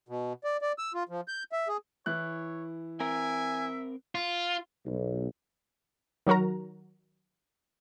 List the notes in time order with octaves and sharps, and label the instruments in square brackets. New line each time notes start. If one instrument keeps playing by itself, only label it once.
[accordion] B2
D5
D5
E6
F4
F3
G6
E5
G#4
[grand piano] E3 E4 F#6 [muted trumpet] C#5
[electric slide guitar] C4 A#4 [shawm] E5 [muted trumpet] G#5
[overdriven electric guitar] F4
[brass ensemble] B1
[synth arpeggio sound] D#3 F#3 F#4 A#4 A#5